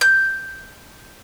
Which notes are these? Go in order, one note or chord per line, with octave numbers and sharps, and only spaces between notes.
G6